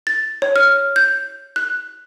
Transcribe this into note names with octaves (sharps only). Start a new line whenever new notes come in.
A6
C#5
F6
G6
F#6